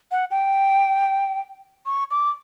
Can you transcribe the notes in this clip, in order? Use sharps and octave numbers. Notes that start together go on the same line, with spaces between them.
F#5
G5
C#6
D6